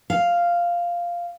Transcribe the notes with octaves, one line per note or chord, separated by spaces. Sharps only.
F5